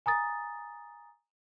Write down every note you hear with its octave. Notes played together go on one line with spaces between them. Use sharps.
G#5 A#5 D#6 A6